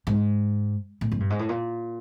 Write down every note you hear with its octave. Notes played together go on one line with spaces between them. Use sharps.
G#2
A2
F#2
G2
G#2
A2
A#2